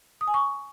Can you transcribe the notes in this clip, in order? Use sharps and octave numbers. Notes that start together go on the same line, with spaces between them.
D#6
G#5
C#6